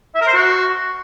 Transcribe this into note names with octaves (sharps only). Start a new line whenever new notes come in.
E5
A#4
C5
F#4